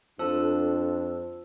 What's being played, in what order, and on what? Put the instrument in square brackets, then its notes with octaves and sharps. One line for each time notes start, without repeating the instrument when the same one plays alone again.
[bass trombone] F2 [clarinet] D4 [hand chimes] F4 C5 E6 [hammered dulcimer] A4